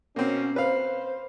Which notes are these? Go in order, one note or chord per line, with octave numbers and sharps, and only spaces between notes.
B2 A#3 C4 C#4
B4 C5 F5